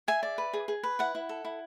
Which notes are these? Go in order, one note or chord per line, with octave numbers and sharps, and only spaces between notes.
G#4 E5 G#5
D5
B4
G#4
G#4
B4
E4 F#5
E4
A4
E4